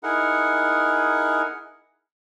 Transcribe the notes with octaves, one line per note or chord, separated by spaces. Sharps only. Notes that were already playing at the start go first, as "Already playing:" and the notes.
D#4 E4 G#4 A#4 F#5